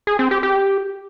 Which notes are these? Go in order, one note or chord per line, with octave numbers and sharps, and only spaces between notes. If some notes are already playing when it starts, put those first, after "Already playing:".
G#4
C4
G4
G4